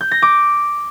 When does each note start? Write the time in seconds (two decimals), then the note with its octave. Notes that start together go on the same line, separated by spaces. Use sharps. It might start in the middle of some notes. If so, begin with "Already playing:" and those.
0.01 G6
0.12 A#6
0.22 D6